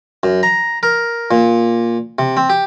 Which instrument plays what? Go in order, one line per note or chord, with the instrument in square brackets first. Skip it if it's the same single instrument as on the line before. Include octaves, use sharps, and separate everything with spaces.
[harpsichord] F#2
A#5
A#4
A#2
C3
C4
G4